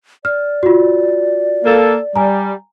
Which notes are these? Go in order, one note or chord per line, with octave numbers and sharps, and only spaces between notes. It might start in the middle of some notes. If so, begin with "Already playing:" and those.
D5 F6
F4 F#4
A#3 A4
G3 G#5 A#5